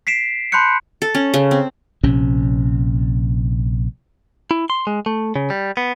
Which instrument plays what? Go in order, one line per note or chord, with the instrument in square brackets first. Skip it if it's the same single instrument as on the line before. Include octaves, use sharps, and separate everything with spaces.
[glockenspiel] B6 C7 D7 E7
A5 B5 C6 F#6 G6 C#7
[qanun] A4
C#4
C#3
C4
[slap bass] A#1 C3 C#4
[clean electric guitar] E4
C6
G#3
A3
C#3
G3
B3